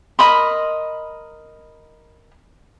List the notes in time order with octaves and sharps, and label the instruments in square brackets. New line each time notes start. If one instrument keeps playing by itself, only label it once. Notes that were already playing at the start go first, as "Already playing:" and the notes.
[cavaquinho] A#4 D#5 B5 C6